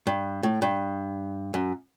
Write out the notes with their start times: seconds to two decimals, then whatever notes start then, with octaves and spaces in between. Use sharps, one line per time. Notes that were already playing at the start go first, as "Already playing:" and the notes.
0.07 G2
0.43 A2
0.62 G2
1.54 F#2